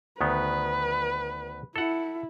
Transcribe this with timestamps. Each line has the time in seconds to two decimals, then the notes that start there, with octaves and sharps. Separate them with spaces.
0.21 D2 D#3 B3 B4
1.76 E4 A4 F#5